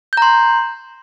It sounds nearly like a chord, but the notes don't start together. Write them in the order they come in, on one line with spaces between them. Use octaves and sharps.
G6 A#5 C6